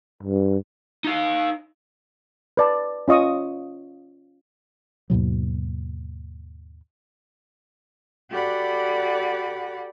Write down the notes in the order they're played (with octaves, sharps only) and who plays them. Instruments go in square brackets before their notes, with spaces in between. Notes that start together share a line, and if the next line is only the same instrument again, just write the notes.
[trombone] G2
[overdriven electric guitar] D#4 F5
[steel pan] B4 D5 A5
C#4 F4 D#5 C#6 D#6
[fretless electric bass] D#2 G#2 B2 F#3
[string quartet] F#4 G4 A4 D5 F#5 B5